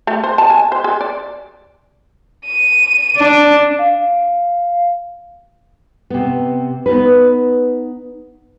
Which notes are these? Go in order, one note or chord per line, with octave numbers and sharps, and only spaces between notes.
A3
C5
A5
G#5
C5
G#4
D5
D#7
D4
F5
C3 B3
B3 D#4 B4